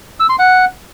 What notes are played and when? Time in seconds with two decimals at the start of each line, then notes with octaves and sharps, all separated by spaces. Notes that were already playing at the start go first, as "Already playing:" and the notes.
0.20 E6
0.29 C6
0.39 F#5